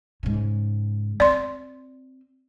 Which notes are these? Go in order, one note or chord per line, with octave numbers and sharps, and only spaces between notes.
G#2 C#3
C4 D5 C6